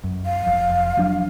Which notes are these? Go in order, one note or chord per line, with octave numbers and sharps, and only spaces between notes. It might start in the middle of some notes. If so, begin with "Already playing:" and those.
F#2
F5
F1 F2
F3 F#3 D4